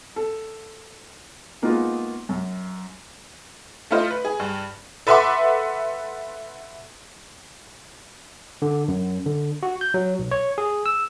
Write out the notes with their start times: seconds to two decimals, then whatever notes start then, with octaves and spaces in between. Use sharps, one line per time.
0.16 A4
1.62 G#3 A#3 B3 D#4 F4 F#4
2.29 F#2
3.90 A3 E4 F4 C5 D#5
4.11 B4
4.25 G#4
4.40 G2
5.07 A4 B4 E5 F#5 C6 D6
8.62 D3
8.88 F#2
9.26 D3
9.63 F#4
9.81 G6
9.94 F#3
10.19 B1
10.31 C#5
10.58 G#4
10.86 E6